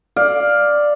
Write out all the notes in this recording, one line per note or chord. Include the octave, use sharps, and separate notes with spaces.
D5 F5